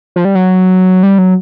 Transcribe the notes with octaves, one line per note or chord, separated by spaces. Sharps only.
F3
G3
F#3
G3
F#3